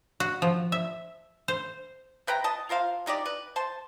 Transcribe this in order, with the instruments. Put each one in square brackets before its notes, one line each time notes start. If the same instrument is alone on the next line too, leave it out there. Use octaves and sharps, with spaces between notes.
[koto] F#4
F3
E5
C5
[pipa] C3 B4 G5 A#5
D#5 A5
F4 A#4 C5 F5
G#3 D#4 G4 D5
B4
C5 A5